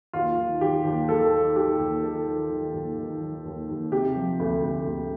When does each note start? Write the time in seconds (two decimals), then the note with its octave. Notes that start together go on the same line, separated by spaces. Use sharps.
0.13 D#2 F4
0.38 D#3
0.61 D#3 G4
0.85 D#2
1.09 D#3 A4
1.33 D#3
1.56 D#3 G4
1.79 D#2
2.03 D#3 A4
2.27 D#3
2.50 D#3
2.74 D#2
2.98 D#3
3.21 D#3
3.45 D#2
3.69 D#2
3.92 C3 G4
4.16 F3
4.40 D2
4.63 D2
4.87 D2